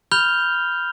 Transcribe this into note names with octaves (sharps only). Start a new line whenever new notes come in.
B5 F6 G6 F7 G7